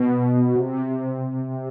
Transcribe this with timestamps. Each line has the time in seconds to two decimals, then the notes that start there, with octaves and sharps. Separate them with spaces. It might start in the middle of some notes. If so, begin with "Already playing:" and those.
Already playing: B2
0.55 C3